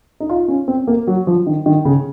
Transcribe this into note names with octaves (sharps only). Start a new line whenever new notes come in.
D#4
F4
C#4
C4
A#3
F#3
F3
D#3
D#3
C#3